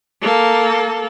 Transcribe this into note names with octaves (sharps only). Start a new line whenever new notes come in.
A#3 A4